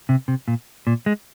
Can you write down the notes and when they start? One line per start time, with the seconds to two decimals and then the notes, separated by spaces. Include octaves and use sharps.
0.09 C3
0.28 C3
0.48 A#2
0.87 A#2
1.06 G#3